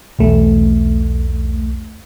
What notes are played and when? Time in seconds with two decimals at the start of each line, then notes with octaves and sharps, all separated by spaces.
0.19 B1 E2 A3